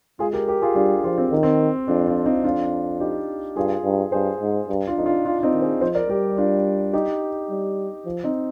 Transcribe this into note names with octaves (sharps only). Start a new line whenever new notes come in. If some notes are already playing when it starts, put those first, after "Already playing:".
G#3 F4 G#4
G4 A#4
G4 A#4
F4 G#4
G3 D4 F4
F3 F4 G#4
C4
D#3
C4
F2 D4
D4 F4
C4 D#4
F2 D4 F4
D#4 G4
G2 F4 G#4
G2
G2 G#4 C5
G#2
G2
D4 F4
F2 D#4
D4 F4
D4 F4
F4
C4 D#4
D#3
G#4 C5
F3 C5 D#5
A#4 D5
G3 G4 A#4
D4 F4
D#4 G4
G3
F3
C4 D#4